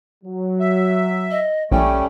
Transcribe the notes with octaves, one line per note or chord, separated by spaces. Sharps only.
F#3
E5
D#5
A#1 G3 A3 C#4 G5